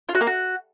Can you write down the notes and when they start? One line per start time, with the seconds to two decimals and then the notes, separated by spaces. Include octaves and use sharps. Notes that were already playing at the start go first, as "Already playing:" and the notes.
0.09 F4
0.15 F#4
0.21 A#3
0.27 F#4